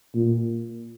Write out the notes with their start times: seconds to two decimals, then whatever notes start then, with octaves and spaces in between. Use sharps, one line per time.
0.14 A#2